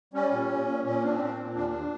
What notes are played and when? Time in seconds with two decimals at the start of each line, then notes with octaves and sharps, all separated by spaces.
0.14 G3 C#4
0.31 A#2
0.49 A#2
0.67 A#2
0.84 A#2 C#4
1.02 C4 D4
1.20 A#2 C4
1.37 A#2
1.55 D#2 D4
1.73 D#2